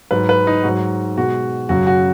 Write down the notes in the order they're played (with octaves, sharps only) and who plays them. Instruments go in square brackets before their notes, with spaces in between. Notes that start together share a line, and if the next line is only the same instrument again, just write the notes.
[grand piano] G#2 F#3 B4
B4
D#4
G#2 F#3 F#4
B2 G#3 F#4
F#2 C#3 F#3 F#4
F#4